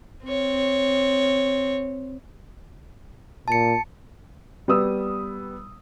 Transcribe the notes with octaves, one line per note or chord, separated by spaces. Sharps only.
C4 C#5
A#2 A5 C#7
G3 B3 D#6 E6